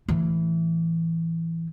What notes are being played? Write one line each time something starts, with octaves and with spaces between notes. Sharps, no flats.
A2 E3